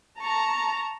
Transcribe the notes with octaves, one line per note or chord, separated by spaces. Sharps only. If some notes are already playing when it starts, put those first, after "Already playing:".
A5 A#5 C#6